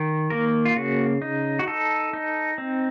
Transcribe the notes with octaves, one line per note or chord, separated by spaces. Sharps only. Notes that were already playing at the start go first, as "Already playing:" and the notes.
Already playing: D#3
A#3 A#4
F4
C#3 F#4
D#4
F#4
D#4 A4
D#4
C4